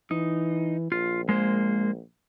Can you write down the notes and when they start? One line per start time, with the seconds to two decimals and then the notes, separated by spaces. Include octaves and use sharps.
0.11 E3 D#4
0.92 A#1 F4
1.29 G#3 A#3 C5